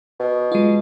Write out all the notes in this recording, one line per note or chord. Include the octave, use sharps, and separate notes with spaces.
B2
G#3 F4